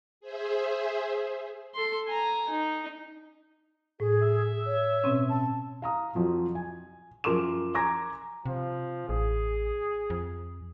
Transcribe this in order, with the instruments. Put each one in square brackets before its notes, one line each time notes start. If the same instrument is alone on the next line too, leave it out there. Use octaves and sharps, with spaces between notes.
[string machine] G#4 C5 E5
[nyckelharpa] A4 C6
G#5 A#5
D#4
[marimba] A2 [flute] G#4
[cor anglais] E5
[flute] C#5
[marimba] B2 C4 C#4
[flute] A5
[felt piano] F5 A#5 D#6
F2 F3 F#3
G#5
F#2 F3 A#4 C6 D6 E7
G#5 A#5 C6 D6 G#6 A#6
[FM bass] C3 [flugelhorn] F3
[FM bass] A1 [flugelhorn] G#4
[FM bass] F2